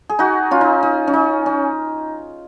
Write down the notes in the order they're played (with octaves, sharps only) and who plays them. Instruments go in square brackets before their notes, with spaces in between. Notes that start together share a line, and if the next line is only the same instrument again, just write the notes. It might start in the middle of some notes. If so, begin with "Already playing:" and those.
[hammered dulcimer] G#4
D#4 F#4
C#4 F4
D#4
D#4
C#4
D#4
C#4